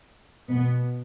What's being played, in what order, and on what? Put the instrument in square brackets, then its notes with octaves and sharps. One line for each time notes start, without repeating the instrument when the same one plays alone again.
[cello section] B2 B3